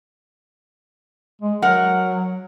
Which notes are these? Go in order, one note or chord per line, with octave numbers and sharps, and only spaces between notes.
G#3
F#3 A#4 F#5